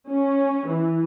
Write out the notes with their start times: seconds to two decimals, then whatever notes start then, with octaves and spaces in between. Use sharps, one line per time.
0.10 C#4
0.68 E3